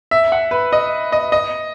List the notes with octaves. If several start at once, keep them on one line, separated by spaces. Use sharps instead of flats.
E5
F#5
B4
D#5
D#5
D#5